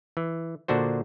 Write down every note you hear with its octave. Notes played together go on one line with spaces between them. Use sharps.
E3
A#2 D3 D4 F#4 C5